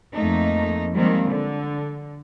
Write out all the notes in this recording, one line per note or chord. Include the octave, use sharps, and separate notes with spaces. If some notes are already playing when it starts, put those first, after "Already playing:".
F2 A3 A#3 D#4
D#3 F3 G3 G#3 A#3 C4
D3